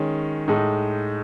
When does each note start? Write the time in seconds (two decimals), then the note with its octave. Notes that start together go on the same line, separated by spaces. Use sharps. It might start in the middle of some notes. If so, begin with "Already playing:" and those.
Already playing: D#3 G#3 C#4
0.48 A2 G#3 D#4